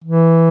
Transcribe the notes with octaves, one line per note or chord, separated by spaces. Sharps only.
E3